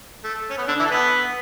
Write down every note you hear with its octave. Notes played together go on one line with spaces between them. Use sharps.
A3
C#4
B3
D3 D4
E3 E4
A4
B3 B4